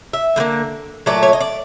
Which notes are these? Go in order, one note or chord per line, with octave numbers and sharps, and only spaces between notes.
E5
D3 G3 A#3
A#2 F#3 A3 D5
C#5
D#5
D5